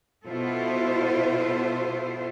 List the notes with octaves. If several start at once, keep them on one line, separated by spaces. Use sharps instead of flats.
B2 E4 F4 A4 C5